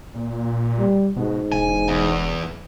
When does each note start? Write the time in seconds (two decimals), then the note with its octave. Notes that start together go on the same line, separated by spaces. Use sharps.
0.14 A#2
0.78 G3
1.16 G#2 B2
1.52 E1 G#5
1.88 E2